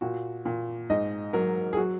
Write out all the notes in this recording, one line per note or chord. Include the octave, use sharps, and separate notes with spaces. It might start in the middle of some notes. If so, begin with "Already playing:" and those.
A#2 F#4
A#2
G#2 D#5
F#3 A#4
G#4
F#3 F#4